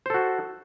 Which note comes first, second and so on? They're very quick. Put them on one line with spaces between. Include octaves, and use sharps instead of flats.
C5 A4 F#4